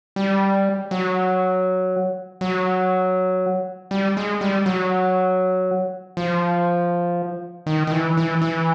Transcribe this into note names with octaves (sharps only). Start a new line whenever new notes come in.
G3
F#3
F#3
G3
G#3
G3
F#3
F3
D#3
D#3
E3
E3
E3